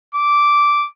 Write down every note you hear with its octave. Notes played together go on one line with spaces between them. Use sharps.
D6